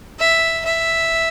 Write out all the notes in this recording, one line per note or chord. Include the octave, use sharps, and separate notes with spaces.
E5
E5